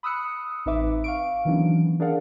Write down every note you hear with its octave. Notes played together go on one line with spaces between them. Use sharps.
B5 D#6 E6 F#6 C#7
A1 C4 D#4 B4 E5 D6
F5 C#6 D7
D#3 E3 F#3 B3 C#4 D4
D4 G#4 A#4 D5 F5 F#5